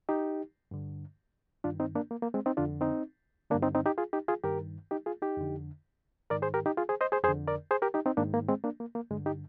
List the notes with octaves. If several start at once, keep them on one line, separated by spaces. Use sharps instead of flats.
D#4 G4
G2 D3
G2 D#3 D4 F4
C4 D#4
A#3 D4
A#3
A#3
G#3 C4
C4 D#4
F2 D3 D4 F4
C4 D#4
G2 D3 A#3 D4
C4 D#4
C4 D#4
D#4 G4
F4 G#4
D#4 G4
F4 G#4
G2 D#3 G4 A#4
D#4 G4
F4 G#4
D#4 G4
F2 D3
G#2 D#3 A#4 D5
G#4 C5
G4 A#4
D#4 G4
F4 G#4
G#4 C5
C5 D#5
G#4 C5
F2 D3 G#4 C5
A#4 D5
G#4 C5
G4 A#4
D#4 G4
C4 D#4
G#2 D#3 A#3 D4
A#3
G#3 C4
A#3 D4
A#3
A#3
G2 D3 G#3
D#4 G4